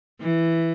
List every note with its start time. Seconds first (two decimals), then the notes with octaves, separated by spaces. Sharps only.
0.21 E3